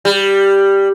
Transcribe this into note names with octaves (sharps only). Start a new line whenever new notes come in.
G3